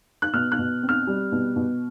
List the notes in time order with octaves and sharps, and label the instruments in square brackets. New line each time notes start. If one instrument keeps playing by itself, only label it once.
[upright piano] F#6
B2 F6
F#6
B2
C4
F6
G3
B2
B2